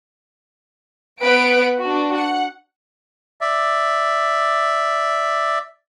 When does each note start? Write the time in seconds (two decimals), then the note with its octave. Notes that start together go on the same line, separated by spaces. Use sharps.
1.20 B3 B4 F#5 D7
1.81 D4 F#4
2.15 F#5
3.41 D5 E5